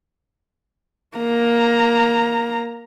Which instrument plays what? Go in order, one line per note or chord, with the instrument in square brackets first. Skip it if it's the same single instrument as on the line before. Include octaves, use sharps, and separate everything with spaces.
[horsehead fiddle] A#3 A#5